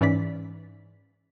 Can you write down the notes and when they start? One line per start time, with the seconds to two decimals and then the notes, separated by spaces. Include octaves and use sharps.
0.01 G#2 E3 C#4 D5 B6